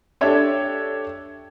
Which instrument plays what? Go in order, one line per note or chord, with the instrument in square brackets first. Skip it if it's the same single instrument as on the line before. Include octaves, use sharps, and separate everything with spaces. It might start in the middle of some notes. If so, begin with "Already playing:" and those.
[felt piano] D4 G4 A4 C#5 E5